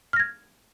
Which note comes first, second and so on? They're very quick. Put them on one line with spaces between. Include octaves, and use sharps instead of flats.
F6 A#6 G#6